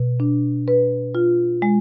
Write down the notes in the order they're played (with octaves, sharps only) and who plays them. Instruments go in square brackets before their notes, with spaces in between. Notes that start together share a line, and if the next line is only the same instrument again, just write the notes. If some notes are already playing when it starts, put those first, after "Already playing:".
Already playing: [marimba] B2
D4
B4
F4
G#3